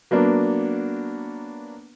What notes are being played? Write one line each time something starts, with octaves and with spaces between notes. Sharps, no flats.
F#3 A#3 B3 D4